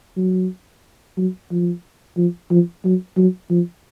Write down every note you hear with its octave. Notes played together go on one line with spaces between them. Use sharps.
F#3
F#3
F3
F3
F3
F#3
F#3
F3